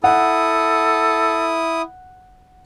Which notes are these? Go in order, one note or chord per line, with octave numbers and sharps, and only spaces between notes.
E4 A4 F#5 D#6